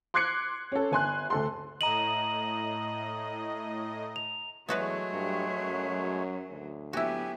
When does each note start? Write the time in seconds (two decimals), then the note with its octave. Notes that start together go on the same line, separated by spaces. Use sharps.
0.14 C6 D6 F#6 G#6 C7 C#7
0.72 C#4 A4
0.91 G1 G#5 C6 F#6
1.30 D2 A4 C6
1.81 A2 D#5 A#5 D#7 F#7
4.16 F7
4.69 E2 F#3 G#3 A3 B3 F#4 B4 C#5
5.12 G2
5.61 F#2
6.50 D2
6.93 F#3 B3 E4 F#4 G4 G#5